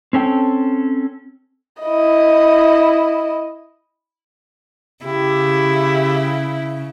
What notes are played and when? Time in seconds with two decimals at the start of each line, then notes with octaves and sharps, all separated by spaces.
0.13 C4 C#4 A4 G5
1.82 E4 D#5
5.05 C#3 E4 G4